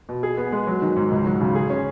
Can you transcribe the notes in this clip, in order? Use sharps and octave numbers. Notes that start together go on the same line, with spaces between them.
B2
G#4
B3
G#3
F#3
D#3
G#2
C#2
F#3
C#3
G#4
C#4